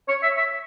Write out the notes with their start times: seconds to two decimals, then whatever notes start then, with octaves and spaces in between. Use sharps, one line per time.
0.08 C#5
0.23 E5
0.37 E5